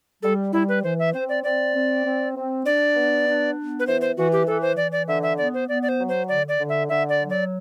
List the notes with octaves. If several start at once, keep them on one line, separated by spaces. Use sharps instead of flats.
G3 A4
G3 E4
B4
E3 C5
E5
C4 C5
D5
C4 D5
C4
C4
C4
D4 D5
B3
D4
B3
B4
E3 C5
C5
E3 F#4
G4
E3 A4
C5
E3 D5
D5
D3 E5
E5
B3 D5
C5
B3 D5
D5
C5
F#3
C5
D3 D5
D5
D3
E5
D3 E5
D5
F#3
D5